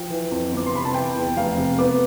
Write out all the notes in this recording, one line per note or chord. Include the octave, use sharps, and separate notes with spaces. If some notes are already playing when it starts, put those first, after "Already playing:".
Already playing: F3 G5
E3
F2
G1
D6
C6
C3 B5
A5
E3 G5
E2
F1 F5
C3
B3 D6